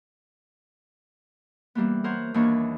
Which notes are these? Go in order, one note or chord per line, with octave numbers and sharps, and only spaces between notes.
E3 G3 A#3 B3
A#4 C5 C#5 F#5
D#2 E3 A#3 D4 C#5 C#6